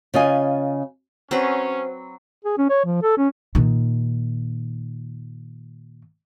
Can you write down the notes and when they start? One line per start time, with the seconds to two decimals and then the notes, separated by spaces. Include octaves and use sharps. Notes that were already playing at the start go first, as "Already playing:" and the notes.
0.14 C#3 F4 D#5 G#5
1.31 F#3 C4 C#4 B4 C5
2.45 G#4
2.58 C#4
2.69 C#5
2.85 F3
3.02 A4
3.17 C#4
3.55 A#2 D#3